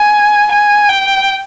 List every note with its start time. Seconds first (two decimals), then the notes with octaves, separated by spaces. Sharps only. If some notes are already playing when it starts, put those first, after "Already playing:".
Already playing: G#5
0.52 G#5
0.89 G5